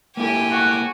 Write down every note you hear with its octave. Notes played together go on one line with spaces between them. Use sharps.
A#3 E4 G4 A4 G#5
F#4 F#6